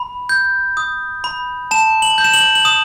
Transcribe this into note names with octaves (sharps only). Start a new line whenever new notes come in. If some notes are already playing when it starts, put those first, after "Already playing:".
Already playing: B5
G6
D#6
B5
A5 E7
F#7
G6
E7
F#7
F#7
D#6 E7